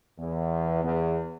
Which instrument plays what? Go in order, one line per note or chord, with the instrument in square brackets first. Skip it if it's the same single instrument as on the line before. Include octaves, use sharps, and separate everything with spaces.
[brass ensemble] E2
E2